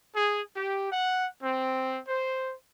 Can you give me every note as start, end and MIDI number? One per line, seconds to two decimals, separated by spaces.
0.15 0.41 68
0.56 0.90 67
0.91 1.27 78
1.43 2.00 60
2.07 2.53 72